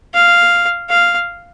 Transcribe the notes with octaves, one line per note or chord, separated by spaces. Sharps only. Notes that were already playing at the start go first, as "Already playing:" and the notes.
F5
F5